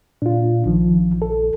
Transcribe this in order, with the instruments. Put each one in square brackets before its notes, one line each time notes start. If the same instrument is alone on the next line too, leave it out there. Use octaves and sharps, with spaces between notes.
[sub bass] A#2 [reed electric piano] D4 F4
[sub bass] A#1 [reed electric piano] D#3 F3
[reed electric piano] A4